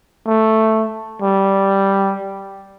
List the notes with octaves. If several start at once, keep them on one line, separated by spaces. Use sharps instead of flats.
A3
G3